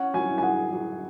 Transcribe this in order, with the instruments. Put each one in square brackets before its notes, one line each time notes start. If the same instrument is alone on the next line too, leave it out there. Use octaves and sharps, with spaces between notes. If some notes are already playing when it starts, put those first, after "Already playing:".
Already playing: [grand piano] C#4 [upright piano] F#5
[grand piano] F#3 [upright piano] G#5
[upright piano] G#5
[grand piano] G#4 [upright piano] F#5
[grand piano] F#3